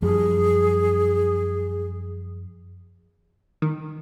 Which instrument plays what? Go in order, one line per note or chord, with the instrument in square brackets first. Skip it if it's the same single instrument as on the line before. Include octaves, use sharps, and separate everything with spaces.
[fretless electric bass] F#2 F3 G3 [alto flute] G#4
[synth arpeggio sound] D#3